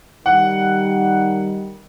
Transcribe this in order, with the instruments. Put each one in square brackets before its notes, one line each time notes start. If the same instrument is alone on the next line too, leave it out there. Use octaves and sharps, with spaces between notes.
[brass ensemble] D#3 G3 [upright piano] F#5